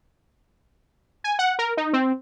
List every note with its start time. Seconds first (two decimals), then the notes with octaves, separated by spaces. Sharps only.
1.24 G#5
1.39 F#5
1.59 A#4
1.77 D#4
1.93 C4